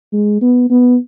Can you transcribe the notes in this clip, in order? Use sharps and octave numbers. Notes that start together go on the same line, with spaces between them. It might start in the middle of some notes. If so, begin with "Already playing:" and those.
G#3
B3
B3